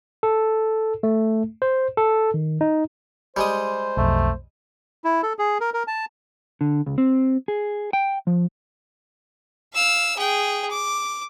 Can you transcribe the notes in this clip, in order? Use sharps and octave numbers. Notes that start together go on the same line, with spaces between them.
A4
A3
C5
A4
D#3
D#4
G3 G#3 C5 D#6
B1 F2 A3
E4
A4
G#4
A#4
A#4
A5
D3
C#2
C4
G#4
G5
F3
F5 E6
G#4 G5
D6